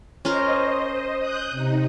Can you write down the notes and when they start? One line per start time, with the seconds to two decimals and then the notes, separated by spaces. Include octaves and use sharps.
0.25 C#4 F4 A#4 C5 D#5
1.18 D#6 F#6 G6
1.51 C3 D#4